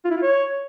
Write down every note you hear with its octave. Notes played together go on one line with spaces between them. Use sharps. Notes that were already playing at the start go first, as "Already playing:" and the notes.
F4
E4
F4
C#5